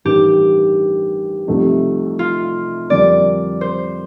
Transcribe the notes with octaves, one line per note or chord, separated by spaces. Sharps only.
A1 G2 D#3 G4
C2 C3 F3 A3 D#4
F4
F2 D3 G3 A#3 D4 D5
C5